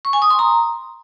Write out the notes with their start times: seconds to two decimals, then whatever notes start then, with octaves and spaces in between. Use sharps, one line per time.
0.05 C#6
0.13 G#5
0.22 D#6
0.30 C6
0.39 A#5